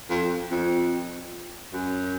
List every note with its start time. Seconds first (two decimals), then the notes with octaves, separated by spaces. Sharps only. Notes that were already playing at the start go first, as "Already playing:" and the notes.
0.10 F2
0.51 F2
1.73 F#2